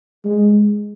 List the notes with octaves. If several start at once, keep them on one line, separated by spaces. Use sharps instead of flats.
G#3